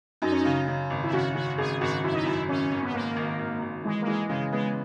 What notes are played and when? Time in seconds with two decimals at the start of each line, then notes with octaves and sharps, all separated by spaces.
0.22 F#2 D#4
0.32 C#4
0.40 C#3 D#4
0.68 C#3
0.90 G#1
1.03 E4
1.13 C#3 F#4
1.35 C#3 F#4
1.58 G#1 G#4
1.81 G#1 F#4
2.03 F#2 E4
2.13 D#4
2.23 F#2 E4
2.49 G#1 C#4
2.71 G#1
2.83 B3
2.94 G#1 A#3
3.16 G#1
3.39 G#1
3.62 G#1
3.84 E3 G#3
4.02 A#3
4.07 E3 G#3
4.29 C#3 G#3
4.52 G#3 B3